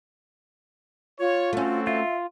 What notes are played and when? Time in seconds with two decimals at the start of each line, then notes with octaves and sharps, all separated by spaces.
1.20 F4 C#5
1.53 A3 C4 C#4 F#4 A4
1.87 F4 E5